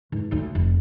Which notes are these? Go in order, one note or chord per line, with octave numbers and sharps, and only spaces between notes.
G#2 E3
D2 D#4
F1